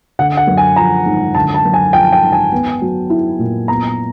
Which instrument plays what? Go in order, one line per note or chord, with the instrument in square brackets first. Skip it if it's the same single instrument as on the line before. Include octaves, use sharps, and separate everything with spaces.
[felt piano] D3 [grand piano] F#5
[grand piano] F#5
[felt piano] F#2
[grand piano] G#5
[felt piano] F3 [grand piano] A#5
[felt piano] G#1
[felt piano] D3 [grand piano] A5
[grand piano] A5
[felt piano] F#2
[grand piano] G#5
[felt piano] F3 [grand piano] G5
[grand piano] G5
[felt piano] G#1
[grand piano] G#5
[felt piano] B3
F#3
E4
A#2
[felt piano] B3 [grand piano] A#5